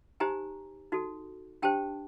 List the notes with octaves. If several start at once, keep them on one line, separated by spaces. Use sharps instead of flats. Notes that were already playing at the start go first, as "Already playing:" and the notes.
D#4 G4 C5 G#5 A#5
D#4 F#4 A4
D4 G4 C5 G5 A5